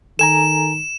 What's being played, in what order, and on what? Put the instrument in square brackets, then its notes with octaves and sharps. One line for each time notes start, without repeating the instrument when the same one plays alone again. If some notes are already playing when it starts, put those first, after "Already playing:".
[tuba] D#3 [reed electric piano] A4 G#5 A#5 [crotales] E7